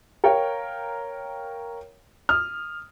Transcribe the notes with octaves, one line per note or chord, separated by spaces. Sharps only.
A#4 C#5 F5 G5
D#6 F6